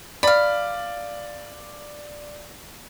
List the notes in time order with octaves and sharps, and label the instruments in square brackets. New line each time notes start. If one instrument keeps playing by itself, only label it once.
[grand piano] D5 [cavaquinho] F5 B5